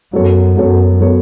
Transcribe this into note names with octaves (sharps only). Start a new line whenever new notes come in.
F#2 F#3 B3 A4 C#5
F#2 F#3 B3 A4 C#5
F#3 B3 A4 C#5